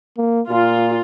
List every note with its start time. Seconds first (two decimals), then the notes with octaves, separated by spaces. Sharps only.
0.17 A#3
0.50 A#2 F4